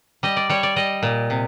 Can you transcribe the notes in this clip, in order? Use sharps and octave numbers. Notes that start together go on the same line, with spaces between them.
G3 D#5
D5
G3 C#5
D5
G3 D#5
A#2
C3